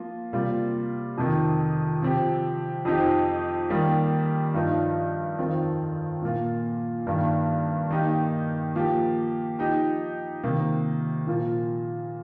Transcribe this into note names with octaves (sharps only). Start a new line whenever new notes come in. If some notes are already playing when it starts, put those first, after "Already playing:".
Already playing: F3 A#3 F4
C3 G3 A#3 F4
F2 C3 D#3
C3 F3 C4 G4
F2 F3 C4 D#4 G4
D#3 G3 A#3 G4
G2 F3 D#4
F2 D#3 C4 F4
A#2 A#3 F4
G2 D#3 A#3
D#3 A#3 D#4 G4
F3 A#3 G4
F3 D#4 G4
C3 D#3 A#3
A#2 F3 A#3 F4